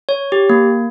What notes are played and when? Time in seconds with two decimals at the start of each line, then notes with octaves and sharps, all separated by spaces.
0.09 C#5
0.32 G4
0.49 A#3